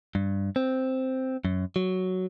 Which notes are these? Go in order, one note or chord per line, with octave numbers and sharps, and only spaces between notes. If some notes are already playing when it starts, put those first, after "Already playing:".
G2
C4
F#2
F#3